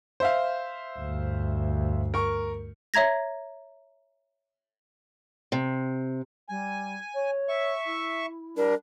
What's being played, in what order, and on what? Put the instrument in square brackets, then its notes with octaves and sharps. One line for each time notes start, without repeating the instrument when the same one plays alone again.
[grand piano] C5 E5 F5
[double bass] D2 G2
[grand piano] A#4 C#6
[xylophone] C#5 E5 A#5 G#6 A#6
[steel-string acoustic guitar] C3
[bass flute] G3 [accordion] G#5
[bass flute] C#5
[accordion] E5 C#6
[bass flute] E4
[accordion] G3 D4 [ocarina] A#4